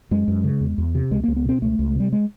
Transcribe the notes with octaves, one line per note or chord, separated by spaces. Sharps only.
F#2 G#3
F#2
C#3
E2
E2
C3
C#2 G#3
A#3
C#2
B3
B2 C4
C#2 A3
C#2
C3 G3
G#3